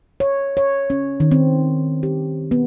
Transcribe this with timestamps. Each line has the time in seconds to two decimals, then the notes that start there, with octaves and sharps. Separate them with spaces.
0.20 C#5
0.57 C#5
0.90 C#4
1.20 D#3
1.31 C4
2.03 G4
2.51 B3